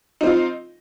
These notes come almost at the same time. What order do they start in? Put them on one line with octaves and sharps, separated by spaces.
D#4 C4 F4